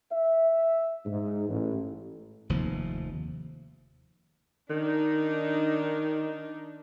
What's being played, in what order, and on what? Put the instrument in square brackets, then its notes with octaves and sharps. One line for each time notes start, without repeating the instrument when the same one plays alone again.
[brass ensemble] E5
G#2
A1
[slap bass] F1 D#2 F3
[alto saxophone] D#3 [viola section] D4 D#4